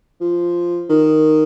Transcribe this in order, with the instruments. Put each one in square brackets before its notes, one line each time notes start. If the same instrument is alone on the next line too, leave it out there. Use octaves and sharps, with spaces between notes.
[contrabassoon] F3
D#3